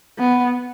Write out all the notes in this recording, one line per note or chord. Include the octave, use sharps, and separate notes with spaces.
B3